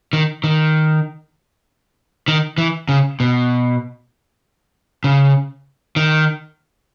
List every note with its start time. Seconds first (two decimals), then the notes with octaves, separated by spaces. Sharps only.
0.13 D#3
0.44 D#3
2.28 D#3
2.58 E3
2.89 C#3
3.20 B2
5.04 C#3
5.96 D#3